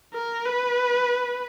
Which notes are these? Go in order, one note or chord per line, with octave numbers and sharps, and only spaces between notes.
A#4
B4